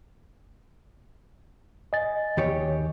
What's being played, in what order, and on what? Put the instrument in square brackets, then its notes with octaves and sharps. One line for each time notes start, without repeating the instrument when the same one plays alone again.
[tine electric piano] D#5 G#5 A6
[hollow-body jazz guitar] D#2 G4 C#5